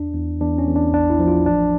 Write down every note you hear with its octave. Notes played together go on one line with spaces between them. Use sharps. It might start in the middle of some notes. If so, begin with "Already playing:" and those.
Already playing: E2 D4
E2
E2 D4
C#4
E2
D4
A1 D4
E4
F3
F4
A1 D4